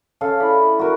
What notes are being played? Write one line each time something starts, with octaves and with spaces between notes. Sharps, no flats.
C#3 A4 F5
D4 E4 B5
F#4 A#4